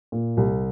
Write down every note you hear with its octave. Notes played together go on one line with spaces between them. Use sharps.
A#2
C2